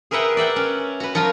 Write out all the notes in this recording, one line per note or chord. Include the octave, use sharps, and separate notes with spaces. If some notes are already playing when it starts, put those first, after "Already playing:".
G#4 A#4 B4 E5 F#5 G5
D5 E5 F#5 G5
C#4
F#4 B4
F3 F#3 F4 F#4 A#4